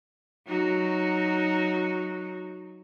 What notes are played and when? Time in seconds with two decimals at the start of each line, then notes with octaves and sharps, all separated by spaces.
0.47 F#3 D#4 F#4